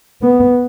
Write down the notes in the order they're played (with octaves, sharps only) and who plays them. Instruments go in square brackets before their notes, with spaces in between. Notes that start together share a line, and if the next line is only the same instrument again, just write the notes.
[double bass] B3